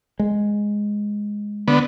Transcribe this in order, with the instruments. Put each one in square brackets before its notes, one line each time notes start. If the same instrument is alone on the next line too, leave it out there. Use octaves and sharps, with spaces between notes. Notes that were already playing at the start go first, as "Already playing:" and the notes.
[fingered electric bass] G#3
[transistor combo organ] D3 B3